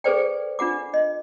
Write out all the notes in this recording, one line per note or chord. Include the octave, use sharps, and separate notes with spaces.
G#4 A4 B4 C5 D5 G5
D4 F4 F#5 D6
D#5